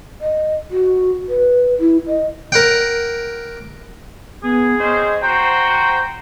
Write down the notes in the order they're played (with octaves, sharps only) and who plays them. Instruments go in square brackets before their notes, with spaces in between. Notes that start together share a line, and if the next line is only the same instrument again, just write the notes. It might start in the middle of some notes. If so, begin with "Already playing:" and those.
[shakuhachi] D#5
F#4
B4
E4
D#5
[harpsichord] A#4 F#5 G5
[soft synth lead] B3 [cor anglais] G#4
[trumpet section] C4 C#4 C5 [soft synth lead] D#5
[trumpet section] F#4 C5 [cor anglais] G5 [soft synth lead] A#5